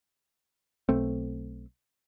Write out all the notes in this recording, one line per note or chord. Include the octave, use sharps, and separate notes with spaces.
B1 A3 C4